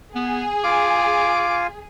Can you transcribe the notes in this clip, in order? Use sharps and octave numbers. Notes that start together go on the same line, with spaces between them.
B3 G#4
F4 F5 G#5 D6